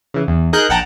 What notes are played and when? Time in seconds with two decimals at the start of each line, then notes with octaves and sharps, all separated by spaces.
0.14 C#3 E3
0.28 E2
0.53 D#4 G#4 A#4 F#6 G6
0.69 A#1 F#5 G5 A5 A#5